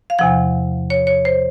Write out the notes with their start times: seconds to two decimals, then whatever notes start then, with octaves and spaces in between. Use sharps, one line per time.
0.10 F5
0.19 E2 C3 F3 F#5
0.90 C#5
1.07 C#5
1.25 C5